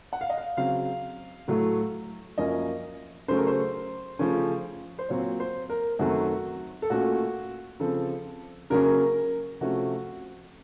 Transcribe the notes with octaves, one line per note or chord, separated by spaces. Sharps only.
F#5
F5
D#5
F5
C#3 F#3 C4 F5
A2 F#3 A3
F#2 F3 A#3 C#4 D#5
C#3 F#3 A3 C#4 C5
A#4
C5
C#3 F3 A3 C#4
C5
A#2 F#3 C4 C#5
C5
A#4
F#2 D#3 F#3 A3 C4 F#4
A4
A#2 A3 C#4 F#4
C#3 F3 C4 A4
C#3 F#3 A#3 C#4 A#4
C3 F3 A3 C#4 F#4